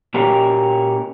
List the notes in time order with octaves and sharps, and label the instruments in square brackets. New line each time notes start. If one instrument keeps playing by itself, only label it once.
[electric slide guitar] A#2 A#3 C#4 F#4 G4 A#4